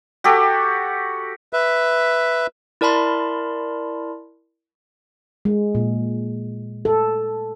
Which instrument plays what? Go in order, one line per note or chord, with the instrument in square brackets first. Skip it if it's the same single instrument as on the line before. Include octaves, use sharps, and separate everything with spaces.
[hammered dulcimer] F#4 G4 A4
[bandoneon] B4 E5
[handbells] E4 A#4 D5 A5 B5 C6
[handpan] G#3
A#2
A4